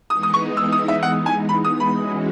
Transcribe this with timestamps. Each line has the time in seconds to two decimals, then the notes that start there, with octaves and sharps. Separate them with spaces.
0.10 E3 G#3 B3 D#4 D#6
0.23 D#6
0.34 C#6
0.57 E6
0.72 D#6
0.88 E5
1.03 F#5
1.26 G#5
1.49 B5
1.65 D#6
1.80 B5
1.95 E3 G#3 C#4 F#4